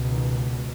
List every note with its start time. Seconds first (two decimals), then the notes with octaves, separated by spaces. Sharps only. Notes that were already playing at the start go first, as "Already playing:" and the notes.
Already playing: C#2 B2
0.10 D#3